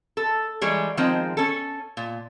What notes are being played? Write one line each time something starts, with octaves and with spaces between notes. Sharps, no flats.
A4
E3 G3 G#3 C#5
D#3 F3 G#3 C4
C#4 A4
A#2